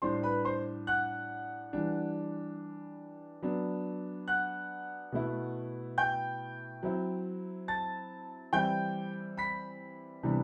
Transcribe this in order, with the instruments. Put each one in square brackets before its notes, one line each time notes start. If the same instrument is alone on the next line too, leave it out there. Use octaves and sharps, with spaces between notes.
[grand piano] A2 G3 D4 C5 C6
B4 B5
C5 C6
F#5 F#6
E3 G3 D4
F#3 B3 D4
F#5 F#6
B2 A3 E4
G5 G6
F#3 C4 E4
A5 A6
E3 G3 C4 E4 G5 G6
B5 B6
C3 E3 G3 B3 D4